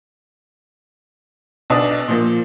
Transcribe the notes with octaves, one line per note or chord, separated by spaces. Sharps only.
B1 B2 D4 D#6
A#2 F3 A#3